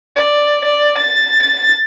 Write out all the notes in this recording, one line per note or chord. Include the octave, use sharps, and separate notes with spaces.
D5
D5
A6
A6